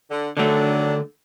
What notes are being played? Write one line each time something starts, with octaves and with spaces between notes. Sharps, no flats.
D3
D3 D#3 F#3 A3 D4